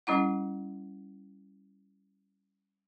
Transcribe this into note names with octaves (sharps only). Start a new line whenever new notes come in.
G3 C#4 E4 F#5